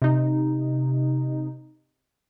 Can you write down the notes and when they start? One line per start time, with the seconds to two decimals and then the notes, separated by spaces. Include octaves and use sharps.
0.02 C3 D#4